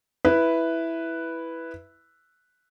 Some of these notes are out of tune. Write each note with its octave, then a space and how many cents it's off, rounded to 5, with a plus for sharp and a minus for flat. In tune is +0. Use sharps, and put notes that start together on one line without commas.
E4 +0 B4 +0